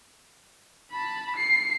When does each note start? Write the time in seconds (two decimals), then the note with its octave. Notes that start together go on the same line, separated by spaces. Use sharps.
0.91 A5 B5
1.36 C7 C#7